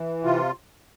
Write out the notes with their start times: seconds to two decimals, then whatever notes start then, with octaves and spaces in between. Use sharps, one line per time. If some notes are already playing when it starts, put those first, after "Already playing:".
Already playing: E3
0.24 C3 F4